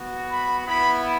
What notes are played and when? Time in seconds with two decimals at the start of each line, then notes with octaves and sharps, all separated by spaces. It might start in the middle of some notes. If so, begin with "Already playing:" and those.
Already playing: B3 F#4
0.30 B5
0.67 B3 E4 B5